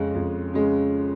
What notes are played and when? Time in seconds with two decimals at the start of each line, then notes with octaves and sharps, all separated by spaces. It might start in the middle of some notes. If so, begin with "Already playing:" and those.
Already playing: F2 C#3 G#3 C#4
0.15 F2
0.53 C#3 G#3 C#4